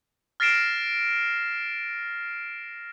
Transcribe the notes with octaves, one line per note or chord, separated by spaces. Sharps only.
F6 A6 A#6 C7 D7 E7